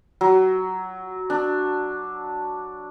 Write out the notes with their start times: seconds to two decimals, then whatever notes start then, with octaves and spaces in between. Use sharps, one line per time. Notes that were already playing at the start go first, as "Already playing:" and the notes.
0.21 F#3
1.30 D4